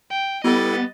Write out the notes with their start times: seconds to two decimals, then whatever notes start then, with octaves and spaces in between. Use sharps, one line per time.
0.10 G5
0.44 G3 B3 E4 A4 D#5 A6